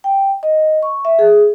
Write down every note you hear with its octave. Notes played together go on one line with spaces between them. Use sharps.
G5
D#5
C#6
E5
G#4